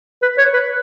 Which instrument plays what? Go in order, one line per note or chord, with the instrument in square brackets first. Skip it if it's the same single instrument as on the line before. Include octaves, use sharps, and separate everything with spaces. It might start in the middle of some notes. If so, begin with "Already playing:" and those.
[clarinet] B4
C#5
B4